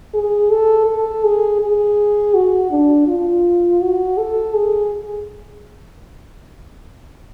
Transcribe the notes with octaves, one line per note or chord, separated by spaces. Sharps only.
G#4
A4
A4
G#4
G#4
F#4
D4
F4
F#4
A4
G#4